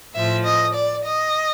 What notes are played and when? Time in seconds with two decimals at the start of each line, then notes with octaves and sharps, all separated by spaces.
0.14 A2 F3 E5
0.44 D#5
0.74 D5
1.04 D#5